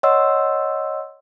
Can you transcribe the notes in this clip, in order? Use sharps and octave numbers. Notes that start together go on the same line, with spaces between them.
C#5 D#5 F#5 C6 E6